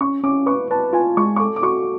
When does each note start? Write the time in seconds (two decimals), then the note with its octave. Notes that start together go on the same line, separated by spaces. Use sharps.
0.01 C#4 C#6
0.24 C#4 D6
0.46 B4 C#6
0.71 B4 A5
0.93 F4 G#5
1.17 G#3 C#6
1.36 C#6
1.40 A4 D6
1.56 D6
1.63 F#4 C#6